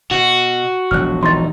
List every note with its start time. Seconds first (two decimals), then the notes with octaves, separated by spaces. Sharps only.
0.11 B2 F#4
0.91 E1 A#1 F#3 F6 F#6
1.23 E2 D#4 C6 A6